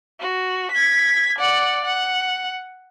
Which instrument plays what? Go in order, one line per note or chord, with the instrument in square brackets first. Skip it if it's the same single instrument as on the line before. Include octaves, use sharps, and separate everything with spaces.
[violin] F#4
G#6 B6
D5 F#5
F#5